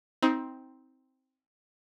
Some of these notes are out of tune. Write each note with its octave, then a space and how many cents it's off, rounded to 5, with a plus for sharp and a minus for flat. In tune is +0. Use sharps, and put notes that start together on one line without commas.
C4 +0 D#4 +30